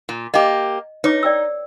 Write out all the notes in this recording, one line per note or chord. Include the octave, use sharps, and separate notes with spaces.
A#2
A#3 G4 D#5
D#4 B4 C#5 D6
D5 G5 E6